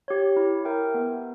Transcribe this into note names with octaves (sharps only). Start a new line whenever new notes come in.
G4 C#5
E4
A#4 E5 G5
B3